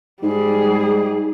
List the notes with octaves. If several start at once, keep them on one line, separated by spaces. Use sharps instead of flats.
G#2 G3 G#4